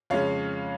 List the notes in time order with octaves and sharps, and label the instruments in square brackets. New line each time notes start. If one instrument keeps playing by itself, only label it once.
[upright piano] F2 C#3 G#3 C#5 F5